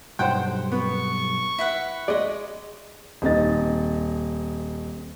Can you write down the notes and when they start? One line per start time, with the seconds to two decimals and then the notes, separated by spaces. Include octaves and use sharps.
0.19 B1 G2 C5 F#5 G5
0.72 B3 C#6
1.58 E4 B4 F#5
2.08 G#3 D5 D#5
3.22 D#1 C4 D#4 A6